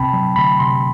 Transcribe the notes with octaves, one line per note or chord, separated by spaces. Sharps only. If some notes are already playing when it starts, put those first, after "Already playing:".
Already playing: D2 C3 C4 G5 A5 B5
F#3
D2 B5
C3 C6